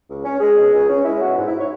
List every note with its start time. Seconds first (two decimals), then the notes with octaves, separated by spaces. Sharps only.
0.08 C#2
0.25 C#4
0.40 G#3 G#4
0.57 B2
0.72 C#2
0.89 C#4
1.05 G#3 E4
1.20 B2 F#4
1.38 G#2
1.47 E4
1.59 C#5